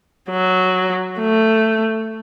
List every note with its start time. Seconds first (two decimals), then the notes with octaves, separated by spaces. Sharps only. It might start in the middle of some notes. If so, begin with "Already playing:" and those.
0.30 F#3
1.19 A3